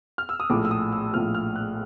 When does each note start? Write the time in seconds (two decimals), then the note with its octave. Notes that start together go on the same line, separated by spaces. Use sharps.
0.18 F6
0.29 E6
0.40 D#6
0.50 A#1 A2 F3 D6
0.65 E6
0.71 D#6
0.92 E6
1.13 A#1 A2 F3 F6
1.34 F6
1.56 F#6